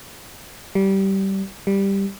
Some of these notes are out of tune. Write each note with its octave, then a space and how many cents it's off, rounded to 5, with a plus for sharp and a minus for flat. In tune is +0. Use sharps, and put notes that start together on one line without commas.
G3 -15
G3 +5